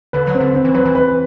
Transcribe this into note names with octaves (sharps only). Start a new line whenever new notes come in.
D3 B4
F#3
C4
D3
C4
E3
F#3 B4
E3
B4